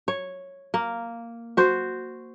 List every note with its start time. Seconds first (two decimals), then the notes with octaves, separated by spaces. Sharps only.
0.08 C#5
0.74 A#3
1.57 F#4 C5